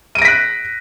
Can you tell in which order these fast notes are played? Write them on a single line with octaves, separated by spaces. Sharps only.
D#7 D7 A#6 B6 F#6